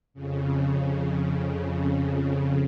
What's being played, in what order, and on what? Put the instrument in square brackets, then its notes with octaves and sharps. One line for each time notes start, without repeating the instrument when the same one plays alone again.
[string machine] F2 C#3